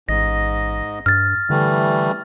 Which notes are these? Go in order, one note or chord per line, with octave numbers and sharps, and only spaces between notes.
A1 G#2 D#5 A#6
G2 F6 A6
D3 E3 G3 A3